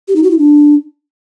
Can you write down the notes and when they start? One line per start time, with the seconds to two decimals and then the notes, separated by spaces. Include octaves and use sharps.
0.08 G4
0.16 D#4
0.23 F#4
0.31 E4
0.38 D4